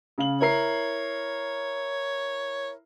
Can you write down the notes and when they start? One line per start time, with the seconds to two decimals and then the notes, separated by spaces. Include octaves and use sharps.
0.18 C#3 F5 F#7
0.41 E4 A#4 C#5 C7